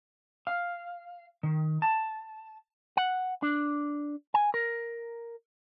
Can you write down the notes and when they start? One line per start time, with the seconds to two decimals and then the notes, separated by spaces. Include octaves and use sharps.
0.47 F5
1.43 D#3
1.82 A5
2.97 F#5
3.43 D4
4.34 G#5
4.54 A#4